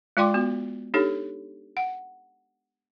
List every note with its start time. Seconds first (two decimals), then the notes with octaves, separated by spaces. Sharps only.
0.17 G#3 F4 D5 G5 C6 D6
0.34 B3 F#4
0.94 D4 D#4 G4 A4 C#5
1.77 F#5